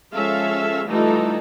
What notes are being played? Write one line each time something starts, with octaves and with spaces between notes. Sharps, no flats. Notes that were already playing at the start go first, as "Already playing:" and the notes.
F3 G#3 C#4 A4 E5 F5
E3 G3 A3 D#4 F4 A4